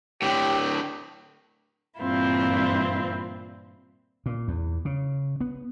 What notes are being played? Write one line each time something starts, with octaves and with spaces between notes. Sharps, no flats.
A2 D3 G4
G2 A#2 E3 C4 E4 F4
A#2
E2
C#3
B3